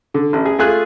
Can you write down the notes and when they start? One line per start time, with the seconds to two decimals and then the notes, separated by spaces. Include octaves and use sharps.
0.14 D3
0.33 A1
0.46 G#4
0.59 A3 F4 G#4 G#5 F#6